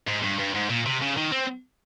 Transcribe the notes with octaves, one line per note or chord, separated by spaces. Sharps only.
G#2
G2
G2
G#2
A#2
C3
C#3
D#3
C4